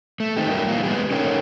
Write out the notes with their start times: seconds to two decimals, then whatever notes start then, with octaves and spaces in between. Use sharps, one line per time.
0.20 A3
0.37 D#3 C4 D#4 G4
0.50 F#3 G3 A#4
0.68 E3 G3 G#3 A#3 F4
0.83 G#3 B3 G4 G#4
1.11 C#4 D#4 A4 A#4 C#5 G5